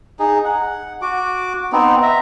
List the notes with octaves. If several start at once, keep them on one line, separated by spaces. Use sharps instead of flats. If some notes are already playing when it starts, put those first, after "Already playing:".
D#4 G#4
F#5
F#4 D6
B3 C4 D#4
E5 A#5